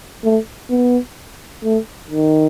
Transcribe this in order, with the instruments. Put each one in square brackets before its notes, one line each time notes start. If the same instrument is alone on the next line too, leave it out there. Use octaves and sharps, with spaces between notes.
[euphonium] A3
B3
A3
D#3